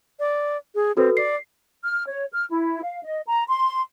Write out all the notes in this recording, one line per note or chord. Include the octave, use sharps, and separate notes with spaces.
D5
G#4
C4 F#4 A4 B4
D5 C7
F6
C#5
F6
E4
F5
D#5
A#5
C6